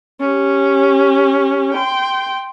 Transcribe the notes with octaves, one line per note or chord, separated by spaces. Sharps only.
C#4 G4
G5 C6